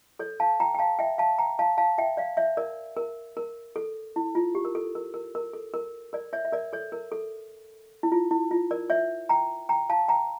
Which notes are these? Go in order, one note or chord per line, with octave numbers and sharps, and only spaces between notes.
A4 C#5
F5 A5
G5 A#5
G5
F5 A5
E5 G5
F5 A5
G5 A#5
F5 A5
F5 A5
E5 G5
D5 F5
C#5 E5
A#4 D5
A#4
A#4
A4
E4
F4
G4
A#4
A4
A#4
A#4
A#4
A4
A#4
A#4 D5
C#5 E5
E5
A#4 D5
A4 C#5
A#4
A4
E4
F4
E4
F4
A#4 D5
C#5 E5
G5 A#5
G5 A#5
F5 A5
G5 A#5